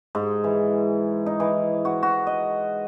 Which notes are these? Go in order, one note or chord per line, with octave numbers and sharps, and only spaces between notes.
G#2
E3
D#4
E3
F#4
F#4
D#5